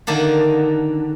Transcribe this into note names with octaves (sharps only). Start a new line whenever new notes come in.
D3 D#3 A#3 D4